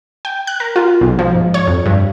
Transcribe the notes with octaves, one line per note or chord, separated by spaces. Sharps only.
G5
F#6
A#4
F4
B1
F3
G#2
C#5
F2
G2